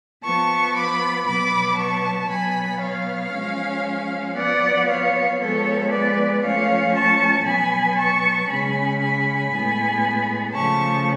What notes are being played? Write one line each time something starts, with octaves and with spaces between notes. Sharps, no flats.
F3 B3 A5 C#6
B5 D6
B2 F#3 B3 B5 D6
A5 C#6
B2 F#3 B3 G#5 B5
C#5 F5
F3 G#3 C#4
F3 B3 D5 F#5
C#5 F5
F3 G#3 B3 A4 C#5
B4 D5
F3 A3 C#4 C#5 F5
A5 C#6
B2 F#3 B3 G#5 B5
A5 C#6
C#3 G#3 C#4 G#5 B5
G#5 B5
A2 G#3 B3
C#3 F3 A3 C#4 A5 C#6